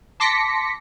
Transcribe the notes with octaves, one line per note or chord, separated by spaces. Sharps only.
A5 C6 D6 A#6 B6 C#7